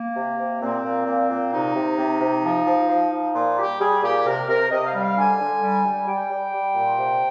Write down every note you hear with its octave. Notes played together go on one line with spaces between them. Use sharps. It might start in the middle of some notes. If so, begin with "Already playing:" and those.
Already playing: A#3
C3
C3
A#2 C4
A#2
A#2
A#2
C3 D#4
C3
C3
C3
F3
F3
F3
F3
A#2 F4
G3 G4
G3 G#4
A#2 G4
C3 A#4
C3 A#4
C3 D#5
F5
G3
F5
D3 G#5
D3
G3
G3
G3 G5
G3
G3
A#2
C3